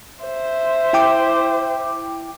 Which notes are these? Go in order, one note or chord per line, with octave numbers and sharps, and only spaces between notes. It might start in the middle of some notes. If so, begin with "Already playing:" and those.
C5 E5
E4 G5 D6